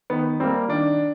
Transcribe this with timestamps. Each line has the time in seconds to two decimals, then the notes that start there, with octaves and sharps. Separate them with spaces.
0.10 D#3 B3
0.40 G3 A#3 C4
0.69 D#3 D4